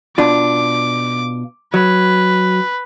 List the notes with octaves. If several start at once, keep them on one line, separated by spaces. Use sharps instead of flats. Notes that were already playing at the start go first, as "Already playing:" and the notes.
B2 D4 F4 D6
F#3 B4